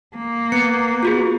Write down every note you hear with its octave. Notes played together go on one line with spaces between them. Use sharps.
A#3
B3 C#7
F4 F#4 G#4